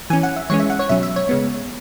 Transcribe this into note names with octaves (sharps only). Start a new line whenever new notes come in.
E3 C#4 G#5
F#5
E5
E3 G#3 C#4 C#5
E5
F#5
C#5
B2 F#3 C#4 E5
E5
C#5
C#3 G#3 B3